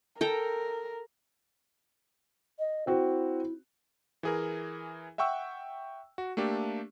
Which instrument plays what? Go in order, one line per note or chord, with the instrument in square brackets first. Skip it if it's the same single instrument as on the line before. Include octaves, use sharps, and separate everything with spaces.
[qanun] A4 G5 A#5 [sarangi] A#4
[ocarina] D#5
[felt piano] C4 F#4 [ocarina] E4
[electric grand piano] E3 G#4 A#4
E5 F#5 G5 C#6 E6
F#4
A3 A#3 D4 G4 A4